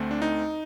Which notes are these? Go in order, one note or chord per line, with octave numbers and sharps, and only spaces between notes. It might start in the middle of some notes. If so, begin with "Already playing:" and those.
Already playing: D2 D3 A3 C4
D4
D#4